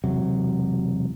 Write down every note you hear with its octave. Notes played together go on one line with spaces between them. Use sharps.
E1 C3 F#3